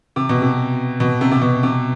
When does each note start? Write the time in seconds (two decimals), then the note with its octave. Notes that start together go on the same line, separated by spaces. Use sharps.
0.16 C3
0.29 B2
0.42 C3
1.00 B2
1.21 C3
1.32 C3
1.42 B2
1.63 C3